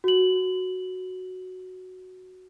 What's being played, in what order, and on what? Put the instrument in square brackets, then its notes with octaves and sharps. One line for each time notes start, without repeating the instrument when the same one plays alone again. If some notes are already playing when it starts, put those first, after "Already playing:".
[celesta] F#4 F#7